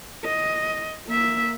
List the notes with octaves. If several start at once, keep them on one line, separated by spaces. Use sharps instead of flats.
D#5
A#3 E5